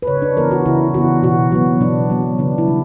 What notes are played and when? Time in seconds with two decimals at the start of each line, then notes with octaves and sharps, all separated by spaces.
0.02 B4
0.07 C#3 C#5
0.22 D4
0.37 E3 B3 A#4
0.51 F#4
0.66 C#3 E4
0.94 E3 B3 F#4
1.23 B2 F#4
1.52 F#3 B3
1.81 B2 D4
2.10 F#3 B3
2.39 C#3 D4
2.58 E4
2.68 G3